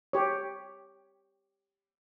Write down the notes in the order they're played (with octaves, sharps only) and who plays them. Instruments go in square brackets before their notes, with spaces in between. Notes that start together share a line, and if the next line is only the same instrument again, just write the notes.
[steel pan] G4 C#5